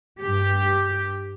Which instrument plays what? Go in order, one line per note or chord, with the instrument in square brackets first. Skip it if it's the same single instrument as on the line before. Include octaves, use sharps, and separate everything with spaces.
[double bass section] G2 [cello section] G4